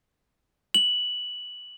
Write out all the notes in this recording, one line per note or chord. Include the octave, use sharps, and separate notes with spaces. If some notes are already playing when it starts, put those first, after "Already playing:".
F#7